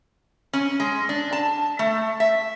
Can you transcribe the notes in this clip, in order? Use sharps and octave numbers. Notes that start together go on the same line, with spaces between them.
C#4
G#3
D4
A5
A3
E5